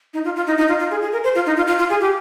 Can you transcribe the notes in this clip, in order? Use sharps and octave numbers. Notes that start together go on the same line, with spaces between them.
D#4
F4
F4
D#4
D#4
F4
F4
G#4
G#4
A#4
C5
F4
D#4
F4
F4
F4
G#4
G4